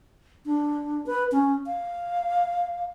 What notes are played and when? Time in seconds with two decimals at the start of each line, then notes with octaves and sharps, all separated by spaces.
0.46 D4
1.06 B4
1.32 C#4
1.66 F5